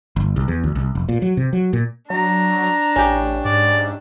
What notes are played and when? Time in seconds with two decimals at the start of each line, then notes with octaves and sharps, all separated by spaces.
0.16 G1
0.36 C2
0.48 E2
0.64 D2
0.75 C2
0.95 F1
1.09 A#2
1.22 F#3
1.37 C3
1.53 F#3
1.73 A#2
2.10 F#3 D4 A#5
2.96 A1 C#4 G4
3.45 G#2 D5